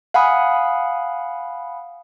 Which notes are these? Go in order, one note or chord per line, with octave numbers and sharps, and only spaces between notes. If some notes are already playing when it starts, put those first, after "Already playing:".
F5 F#5 G#5 B5 D#6